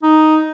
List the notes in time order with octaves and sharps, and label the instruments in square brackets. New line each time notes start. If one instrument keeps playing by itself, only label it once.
[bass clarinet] D#4